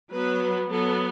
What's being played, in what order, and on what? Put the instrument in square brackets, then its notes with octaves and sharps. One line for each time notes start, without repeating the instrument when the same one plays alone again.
[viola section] F#3 B3 B4
F#3 B3 A4